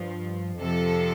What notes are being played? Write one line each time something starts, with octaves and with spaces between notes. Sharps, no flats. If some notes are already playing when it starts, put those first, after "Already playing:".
Already playing: G2 F3
F2 C3 F3 A4